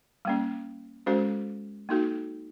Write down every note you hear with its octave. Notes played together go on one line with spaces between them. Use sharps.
G3 A#3 C#4
G#3 C#4 F#4 A4 C5
A#3 D#4 F#4 A4